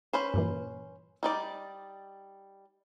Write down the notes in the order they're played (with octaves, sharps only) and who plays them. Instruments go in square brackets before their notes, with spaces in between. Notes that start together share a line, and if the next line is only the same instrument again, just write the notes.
[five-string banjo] C#4 B4 C5
[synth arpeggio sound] G2 A#2 E3
[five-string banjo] G3 D#4 D5